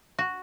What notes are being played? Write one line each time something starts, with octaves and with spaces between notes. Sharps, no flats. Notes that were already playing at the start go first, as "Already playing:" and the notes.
F#4